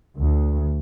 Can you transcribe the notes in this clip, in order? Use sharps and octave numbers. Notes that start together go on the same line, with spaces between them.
D2